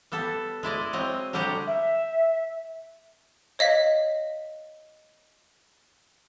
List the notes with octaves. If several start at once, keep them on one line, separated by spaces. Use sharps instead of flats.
G3 B3 A4
G#3 E4 D5 D#5
F#3 C4 D#5
D3 G3 G#3 G4 F#5 A#5
E5
C#5 D#5 F5 B6